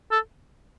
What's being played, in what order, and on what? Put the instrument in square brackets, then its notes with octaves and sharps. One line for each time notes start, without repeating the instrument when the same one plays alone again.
[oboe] A4